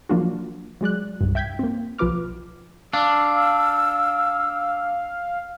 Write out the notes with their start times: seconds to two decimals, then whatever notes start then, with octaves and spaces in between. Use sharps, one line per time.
0.09 F3 F#3 A#3 D4 F4 F#4
0.81 F#3 G#3 D5 F#6
1.21 C2 G2
1.35 E5 G5 G6 G#6 B6
1.59 A#3 C4
1.99 B1 F3 F4 B4 D6 F6
2.93 D4 F5 E6